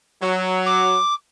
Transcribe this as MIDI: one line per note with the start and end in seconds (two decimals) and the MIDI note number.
0.21 0.97 54
0.66 1.14 86